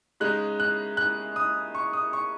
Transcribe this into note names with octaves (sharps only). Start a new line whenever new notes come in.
C#3 G#3 D#4 F#6
F#6
F#6
D#6
C#6
D#6
C#6